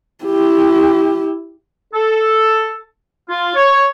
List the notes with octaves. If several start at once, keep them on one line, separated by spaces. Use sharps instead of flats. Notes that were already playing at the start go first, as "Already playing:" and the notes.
E4 G4
A4
F4
C#5